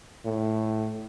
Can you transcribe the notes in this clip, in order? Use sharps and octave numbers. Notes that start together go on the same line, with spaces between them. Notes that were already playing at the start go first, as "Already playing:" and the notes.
A2